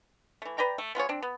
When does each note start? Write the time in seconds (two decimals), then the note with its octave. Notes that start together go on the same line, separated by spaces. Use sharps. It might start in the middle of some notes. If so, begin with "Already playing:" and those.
0.42 E3 A3
0.58 B4 D5 G5 A#5
0.78 A3
0.95 B3 F4 G#4 C#5
1.09 C4 D4
1.22 B3